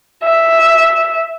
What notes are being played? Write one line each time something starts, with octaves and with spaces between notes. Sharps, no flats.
E5